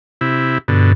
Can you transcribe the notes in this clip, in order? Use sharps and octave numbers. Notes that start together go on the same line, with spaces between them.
C3 E4
G2 B2 D3